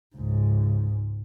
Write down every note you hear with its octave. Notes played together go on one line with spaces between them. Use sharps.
C#2 G#2